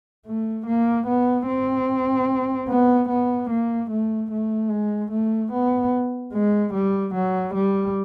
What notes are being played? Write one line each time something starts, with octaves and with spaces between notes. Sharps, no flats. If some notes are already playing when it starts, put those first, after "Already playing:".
A3
A#3
B3
C4
B3
B3
A#3
A3
A3
G#3
A3
B3
G#3
G3
F#3
G3